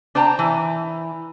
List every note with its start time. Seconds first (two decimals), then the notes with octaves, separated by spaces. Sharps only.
0.15 D4 C5 G5 A5 A#5
0.39 E3